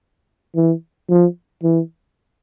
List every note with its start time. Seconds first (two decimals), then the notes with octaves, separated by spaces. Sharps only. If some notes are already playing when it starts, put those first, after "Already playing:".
0.56 E3
1.10 F3
1.63 E3